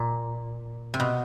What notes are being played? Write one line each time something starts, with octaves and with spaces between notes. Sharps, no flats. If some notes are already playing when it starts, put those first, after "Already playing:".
Already playing: A#2
C3
B2